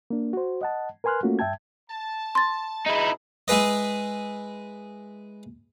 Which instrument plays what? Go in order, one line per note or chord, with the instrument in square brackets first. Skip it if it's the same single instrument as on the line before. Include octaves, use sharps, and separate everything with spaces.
[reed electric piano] A#3 D4
F#4 C5
D#5 F#5 A5
A#4 B4 G#5 C6 F6 F#6
A3 A#3 C#4 F4 F#4
G2 E5 G5 A5 G#6
[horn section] A5
[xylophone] C6 A6
[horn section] B2 G#4 [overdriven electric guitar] D#4 E4
[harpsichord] G#3 E4 G#4 B4 D#5